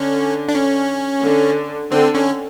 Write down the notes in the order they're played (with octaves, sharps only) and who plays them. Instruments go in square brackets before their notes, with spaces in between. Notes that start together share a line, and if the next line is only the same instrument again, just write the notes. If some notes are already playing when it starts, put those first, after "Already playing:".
Already playing: [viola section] D3 [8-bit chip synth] C#4
[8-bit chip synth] D4
C#4
[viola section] D3
[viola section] D3 [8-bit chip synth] C4
[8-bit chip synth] C#4